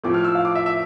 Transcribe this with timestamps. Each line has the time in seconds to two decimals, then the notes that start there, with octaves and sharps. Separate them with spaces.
0.04 A2 F3 A3 D6
0.14 F6
0.24 E6
0.35 F5
0.45 D6
0.55 E5
0.66 E5